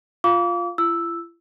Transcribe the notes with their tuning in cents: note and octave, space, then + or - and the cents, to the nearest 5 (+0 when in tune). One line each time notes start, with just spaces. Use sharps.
F4 +0 F5 +0 D6 -35
E4 +45 E6 +0